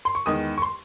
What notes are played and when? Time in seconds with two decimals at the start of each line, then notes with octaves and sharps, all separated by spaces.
0.05 C6
0.15 C#6
0.26 E2 D#3 G#3 D#6
0.58 C#6
0.62 C6